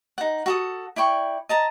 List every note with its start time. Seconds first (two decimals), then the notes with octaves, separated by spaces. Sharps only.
0.18 D#4 F#5
0.46 F#4 A4 D#6
0.96 E4 D5 G5 C#6
1.49 D#5 A5 A#5